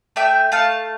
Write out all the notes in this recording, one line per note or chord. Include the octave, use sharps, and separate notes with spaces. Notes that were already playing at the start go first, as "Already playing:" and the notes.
A3 E5 G5
A3 F5 A5